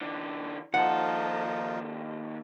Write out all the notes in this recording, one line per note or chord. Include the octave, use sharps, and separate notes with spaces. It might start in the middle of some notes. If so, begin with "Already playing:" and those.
D3 E3
D#2 F3 D#4 F4 A4 F#5